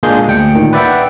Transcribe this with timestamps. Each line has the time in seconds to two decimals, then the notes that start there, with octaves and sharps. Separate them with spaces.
0.03 A#2 G#3 A#3 D4 G#4 G6
0.27 D2 G5 C#7
0.54 A#2 D#3
0.73 B4 D5 E5 F#5 G5